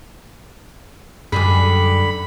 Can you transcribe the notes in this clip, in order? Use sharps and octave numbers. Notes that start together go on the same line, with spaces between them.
F#2 D3 G3 G#4 B5